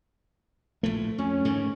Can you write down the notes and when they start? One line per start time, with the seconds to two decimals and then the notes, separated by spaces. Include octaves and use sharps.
0.83 A#1 A2 F3 A3
1.18 F2 C#4
1.45 G#2 D3 D#3